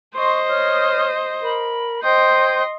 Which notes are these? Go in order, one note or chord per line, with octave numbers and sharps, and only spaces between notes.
C5 D#5 C6 C#6
C#5 D#6 F6
A#4 B5
C5 D#5 G5 C6 G6